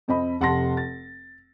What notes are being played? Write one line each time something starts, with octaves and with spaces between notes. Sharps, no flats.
F2 C4 D#5 B5
F1 F#5 A5 C6 A#6
A6